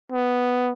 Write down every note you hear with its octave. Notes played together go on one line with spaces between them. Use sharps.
B3